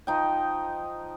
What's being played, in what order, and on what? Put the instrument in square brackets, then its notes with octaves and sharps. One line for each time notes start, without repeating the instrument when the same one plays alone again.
[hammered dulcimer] F3 D#4 G5